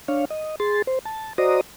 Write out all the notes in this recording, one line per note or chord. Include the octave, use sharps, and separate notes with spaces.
D4 C#5 F5
D#5
G#4 C6 A6
C5
A5
F#4 C5 D5 D#5 A#5 D#6